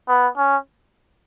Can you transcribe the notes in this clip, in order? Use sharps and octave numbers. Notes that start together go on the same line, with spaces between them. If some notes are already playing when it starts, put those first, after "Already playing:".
B3
C#4